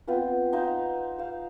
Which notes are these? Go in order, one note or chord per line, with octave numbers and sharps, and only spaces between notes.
B3 C4 F4 B4
D#4 B4 C5 F5
C5 F5